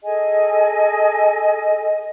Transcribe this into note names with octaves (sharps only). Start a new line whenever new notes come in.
G#4 A4 D#5 G#5